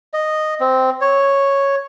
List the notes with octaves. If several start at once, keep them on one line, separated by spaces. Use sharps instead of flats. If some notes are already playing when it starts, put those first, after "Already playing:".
D#5
C4
C#5